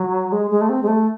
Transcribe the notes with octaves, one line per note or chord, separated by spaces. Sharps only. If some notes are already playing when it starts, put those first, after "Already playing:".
Already playing: F#3
G#3
G#3
A3
C4
G#3
A3